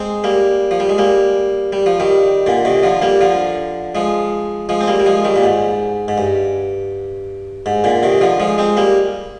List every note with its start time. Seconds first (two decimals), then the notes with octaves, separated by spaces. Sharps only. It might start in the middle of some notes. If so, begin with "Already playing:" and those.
Already playing: G#3 C4
0.24 G3 A#3
0.71 F3
0.80 G3
0.89 G#3
0.98 G3 A#3
1.72 G3
1.86 F3
2.00 D#3 G3
2.46 A#2 D3
2.65 C3 D#3
2.83 D3 F3
3.02 G3 A#3
3.21 D3 F3
3.95 F3 G#3
4.69 F3 G#3
4.81 C4
4.87 G3 A#3
5.00 G3
5.06 F3 G#3
5.25 D#3 G3
5.36 A#2
5.43 G#2
6.08 G#2
6.18 G2
7.66 G#2
7.84 A#2 D3
8.03 C3 D#3
8.21 D3 F3
8.40 F3 G#3
8.58 G#3 C4
8.77 G3 A#3